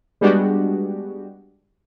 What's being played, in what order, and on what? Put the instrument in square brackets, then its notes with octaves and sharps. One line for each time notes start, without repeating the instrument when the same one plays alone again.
[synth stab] G3 G#3 B3 D4 F#4 G4